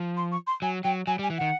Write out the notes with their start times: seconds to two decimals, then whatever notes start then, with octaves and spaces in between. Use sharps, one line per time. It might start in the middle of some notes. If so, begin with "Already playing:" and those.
Already playing: F3
0.17 C6
0.32 C#6
0.47 C6
0.62 F#3 G#5
0.84 F#3 G5
1.07 F#3 G#5
1.19 G3
1.23 G#5
1.30 E3
1.38 D#3 F#5